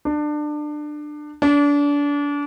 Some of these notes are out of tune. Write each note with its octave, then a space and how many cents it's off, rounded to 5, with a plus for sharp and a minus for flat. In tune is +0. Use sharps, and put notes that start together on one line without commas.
D4 +25
D4 -30